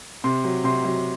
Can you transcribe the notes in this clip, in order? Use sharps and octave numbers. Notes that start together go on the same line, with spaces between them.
C3 C6
F#3
C3 C6
F#3